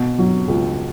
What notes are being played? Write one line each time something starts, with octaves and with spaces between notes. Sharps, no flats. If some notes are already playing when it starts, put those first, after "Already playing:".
Already playing: B2
F#3
C#2